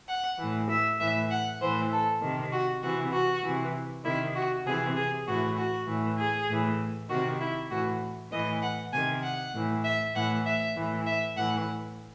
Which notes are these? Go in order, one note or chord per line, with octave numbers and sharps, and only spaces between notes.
F#5
A2 E3
E5
A2 E3 E5
F#5
A2 E3 C5
A4
C3 D#3
F#4
C3 E3 F#4
F#4
C3 E3
C3 D#3 E4
F#4
C3 E3 G#4
G#4
A2 E3 F#4
F#4
A2 E3
G#4
A2 E3
C3 D#3 F#4
E4
A2 E3 F#4
A2 E3 D#5
F#5
C3 D#3 G#5
F#5
A2 E3
E5
A2 E3 F#5
E5
A2 E3
E5
A2 E3 F#5